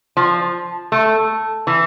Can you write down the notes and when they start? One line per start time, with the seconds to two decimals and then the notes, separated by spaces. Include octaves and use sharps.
0.17 F3
0.92 A3
1.67 E3